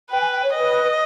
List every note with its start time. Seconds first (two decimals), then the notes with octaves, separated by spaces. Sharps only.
0.10 B4 G5
0.21 G#5
0.32 G5
0.43 C#5
0.54 B4 D#5